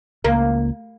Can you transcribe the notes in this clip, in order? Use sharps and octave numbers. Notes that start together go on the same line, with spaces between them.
C#2 A#3